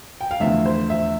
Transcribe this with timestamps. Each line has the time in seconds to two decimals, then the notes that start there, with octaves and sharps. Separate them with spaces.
0.21 G5
0.31 F5
0.40 E2 D3 F3 A3 E5
0.66 C5
0.90 E5